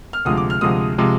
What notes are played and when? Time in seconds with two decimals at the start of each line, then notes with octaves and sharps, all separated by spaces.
0.13 F6
0.25 D2 C3 F3 G#3 D#6
0.37 D6
0.50 F6
0.61 D2 C3 F3 G#3 D#6
0.98 C3 F3 G#3